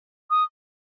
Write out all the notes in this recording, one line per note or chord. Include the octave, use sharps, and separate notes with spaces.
D#6